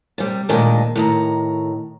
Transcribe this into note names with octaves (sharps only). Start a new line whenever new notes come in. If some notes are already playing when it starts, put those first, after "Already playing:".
C3 G3
D2 A#2 D#3 G#3 D4
A2 D#3 A#5